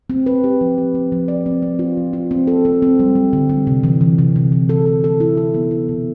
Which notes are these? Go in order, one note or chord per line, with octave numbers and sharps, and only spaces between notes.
C4
B4
G4
F3
C4
C4
F3
D5
C4
C4
F4
F3
F4
C4
A4
C4
C4
G3
G3
D3
G3
C3
E3
E3
C3
C3
E3
A4
A4
A4
E4
A4
B3
E4
B2